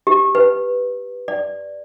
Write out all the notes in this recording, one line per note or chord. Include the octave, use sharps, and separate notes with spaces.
G4
B4
D5